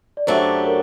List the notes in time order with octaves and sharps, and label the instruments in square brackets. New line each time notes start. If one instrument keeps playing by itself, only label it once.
[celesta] D5
[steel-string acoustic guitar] F#2 F#3 A3 D4 G4 [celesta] C5
[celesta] A#4